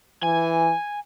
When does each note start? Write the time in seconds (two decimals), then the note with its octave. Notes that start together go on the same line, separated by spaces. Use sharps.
0.23 E3 G#5